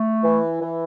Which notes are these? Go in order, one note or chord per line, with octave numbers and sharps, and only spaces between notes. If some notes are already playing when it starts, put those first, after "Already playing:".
Already playing: A3
E3
E3